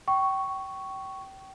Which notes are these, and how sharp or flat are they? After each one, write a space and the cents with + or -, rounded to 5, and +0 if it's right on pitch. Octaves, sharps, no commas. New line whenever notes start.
G5 -30 C#6 +0